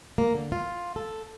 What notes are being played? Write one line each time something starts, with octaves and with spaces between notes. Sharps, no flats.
A#3
D3
F4
A4